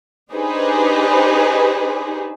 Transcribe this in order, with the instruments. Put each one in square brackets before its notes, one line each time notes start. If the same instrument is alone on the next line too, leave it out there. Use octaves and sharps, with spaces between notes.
[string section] D4 D#4 G4 G#4 B4 C5